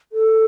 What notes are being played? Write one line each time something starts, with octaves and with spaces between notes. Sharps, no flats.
A4